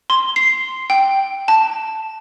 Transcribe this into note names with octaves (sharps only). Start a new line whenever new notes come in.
C6
C7
G5
A5